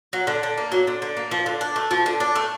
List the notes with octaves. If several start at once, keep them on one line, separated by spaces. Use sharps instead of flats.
F#3
D3
D3
A#3
F#3
D3
D3
A#3
F3
D3
D4
A3
F3
D3
D4
A3